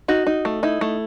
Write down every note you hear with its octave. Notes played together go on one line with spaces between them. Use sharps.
D#4 F#4
D#4
A3
D#4 E4
A3